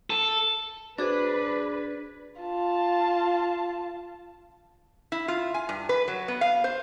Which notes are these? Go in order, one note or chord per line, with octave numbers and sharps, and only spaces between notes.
A4
D4 F#4 G#4 B4 C5 D6
F4 A5
E4
F4
G#5
G2
B4
F#3
B3
F5
C5